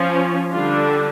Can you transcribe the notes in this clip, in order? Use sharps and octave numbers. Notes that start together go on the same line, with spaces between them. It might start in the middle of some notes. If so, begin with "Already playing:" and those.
Already playing: F3 C#4
D3 G3 D4 F4